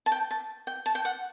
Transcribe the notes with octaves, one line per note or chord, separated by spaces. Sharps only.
A5
G5
A5
G5
A5
G5
F#5